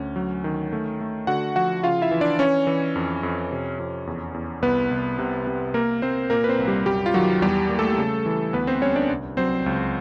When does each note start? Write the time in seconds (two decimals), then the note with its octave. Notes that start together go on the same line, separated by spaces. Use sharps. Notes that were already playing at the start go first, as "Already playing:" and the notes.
Already playing: D2 C#4
0.16 F#3
0.44 D#3
0.73 A3
1.00 A3
1.27 D3 F#4 F#5
1.56 F3 F#4 F#5
1.83 C#3 F4 F5
2.02 E4 E5
2.11 E3
2.21 D4 D5
2.39 E3 C#4 C#5
2.67 E3
2.96 F2
3.23 F2
3.52 C3
3.79 F2
4.07 E2
4.34 E2
4.62 C2 B3 B4
4.91 C2
5.19 C3
5.47 C3
5.74 A#3 A#4
6.02 A#3 C4 C5
6.30 A#2 A#3 A#4
6.44 B4
6.48 C4 C5
6.59 C2
6.68 G3 G4
6.86 F#2 G3 G4
7.06 F4
7.14 D#3 F#3 F#4
7.42 E2 G3 G4
7.69 A#3
7.79 A3 A4
7.98 C#3
8.26 E3
8.53 D2 B3 B4
8.67 C4 C5
8.82 G3 C#4 C#5
8.96 D4 D5
9.09 C2
9.37 F#3 C4 C5
9.66 C#2